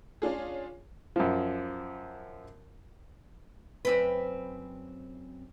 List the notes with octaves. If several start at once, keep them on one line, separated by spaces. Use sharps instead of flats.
C#4 D4 F4 G#4
F#2 F3
F#2 C4 B4